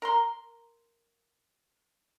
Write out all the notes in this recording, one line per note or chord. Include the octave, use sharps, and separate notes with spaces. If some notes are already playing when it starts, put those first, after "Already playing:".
A#4 A#5 C6